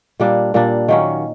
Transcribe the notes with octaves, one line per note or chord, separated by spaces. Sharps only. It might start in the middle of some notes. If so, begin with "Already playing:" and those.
A#2 G3 A#3 D4
A#2 G3 A#3 D4
D#3 F#3 A#3 C#4